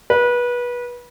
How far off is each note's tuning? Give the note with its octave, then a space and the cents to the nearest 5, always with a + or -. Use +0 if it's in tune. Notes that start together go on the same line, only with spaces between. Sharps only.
B4 -25